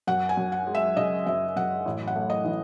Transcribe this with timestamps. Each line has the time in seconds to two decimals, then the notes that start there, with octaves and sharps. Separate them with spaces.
0.07 F#2 F#5
0.29 G#5
0.37 F#2
0.52 F#5
0.67 G#3
0.75 E5
0.97 C#3 D#5
1.26 F#2 E5
1.56 F#2 F#5
1.86 A1
2.07 F#5
2.16 A3
2.30 D#5
2.45 E3